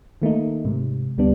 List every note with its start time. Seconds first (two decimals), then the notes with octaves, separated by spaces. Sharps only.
0.22 D#3 A3 A#3 D#4
0.65 G#2 C3
1.18 D2 G3 B3 D4